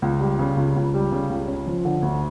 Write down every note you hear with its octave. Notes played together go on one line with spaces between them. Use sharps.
C#2
G3
C#3
C#2
C#2
G3
C#3
C#2
C#4
F3
D3
D2